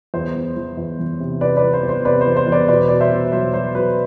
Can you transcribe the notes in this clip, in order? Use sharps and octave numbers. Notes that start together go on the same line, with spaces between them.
E2 C5
E3
E3
E2
E3
C3
C3 B4 D5
B4 D5
E3
C5
E2
C5
C3 B4 D5
C5
E2
C5
E2
B4 D5
B2 B4 D5
B2 D5
C5 E5
B2
F#3 C5 E5
F#3 C5
F#3 B4